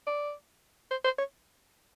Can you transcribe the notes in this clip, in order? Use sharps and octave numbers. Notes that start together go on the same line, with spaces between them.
D5
C5
C5
C#5